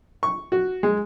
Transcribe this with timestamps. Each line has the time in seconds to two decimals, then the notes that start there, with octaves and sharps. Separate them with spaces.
0.23 C#6
0.52 F#4
0.83 G#3